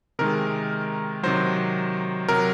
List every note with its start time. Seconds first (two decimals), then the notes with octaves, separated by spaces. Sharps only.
0.19 C3 D#3 G#3 A#4
1.23 C3 D#3 F#3 C5
2.28 C3 F#3 A#4